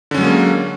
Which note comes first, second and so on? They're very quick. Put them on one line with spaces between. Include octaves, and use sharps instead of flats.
D3 C#4 F#3 G#3 A#3